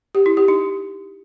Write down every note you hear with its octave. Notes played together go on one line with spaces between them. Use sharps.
G4
E4
G4
D#4